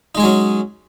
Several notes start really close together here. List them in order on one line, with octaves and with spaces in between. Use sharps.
D#4 G#3 G#4 F#3 C#4